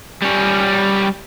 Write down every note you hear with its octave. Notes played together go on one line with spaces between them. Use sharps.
G3 C#4